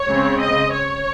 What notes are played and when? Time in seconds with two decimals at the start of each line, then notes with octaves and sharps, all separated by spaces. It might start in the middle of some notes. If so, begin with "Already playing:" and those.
Already playing: C#5
0.08 C#3 G#3 C4
0.41 D#5
0.73 C#5